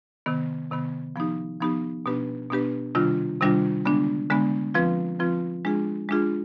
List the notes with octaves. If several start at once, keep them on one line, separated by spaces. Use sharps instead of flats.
C3 D#3 B3
C3 D#3 B3
F3 B3 D#4 G4
F3 B3 D#4 G4
B2 B3 D4 G4 B4
B2 B3 D4 G4 B4
C3 D#3 G3 D4 F4
C3 D#3 G3 D4 F4
D3 G#3 B3 D4
D3 G#3 B3 D4
F3 C4 F4 B4
F3 C4 F4 B4
G#3 D4 F4 G#4
G#3 D4 F4 G#4